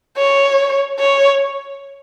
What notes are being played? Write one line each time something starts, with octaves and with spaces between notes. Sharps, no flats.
C#5
C#5